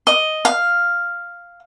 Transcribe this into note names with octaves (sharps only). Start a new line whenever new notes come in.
D#5
F5